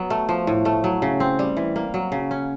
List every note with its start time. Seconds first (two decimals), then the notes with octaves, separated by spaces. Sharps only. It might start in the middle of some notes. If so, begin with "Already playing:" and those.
Already playing: F#3 B3
0.10 A3
0.29 F3
0.47 A2
0.65 A3
0.84 F#3
1.02 C#3
1.20 C4
1.39 G3
1.57 E3
1.76 A#3
1.94 F#3
2.12 C#3
2.31 C#4